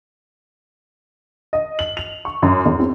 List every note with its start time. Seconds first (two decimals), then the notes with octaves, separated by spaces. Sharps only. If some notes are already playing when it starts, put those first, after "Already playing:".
1.53 D#5
1.79 F#7
1.97 F7
2.25 C#6
2.42 F#2
2.65 E2
2.80 C4